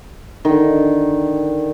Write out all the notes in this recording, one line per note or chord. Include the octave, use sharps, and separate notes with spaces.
D3 D#3